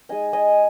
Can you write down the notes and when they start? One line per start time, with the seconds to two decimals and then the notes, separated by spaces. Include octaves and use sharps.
0.09 G#3 D#4 D#5 G#5
0.33 D#5 G#5